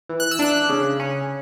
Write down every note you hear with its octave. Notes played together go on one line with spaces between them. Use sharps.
E3
F#6
E6
D4 F#6
C#3
C#4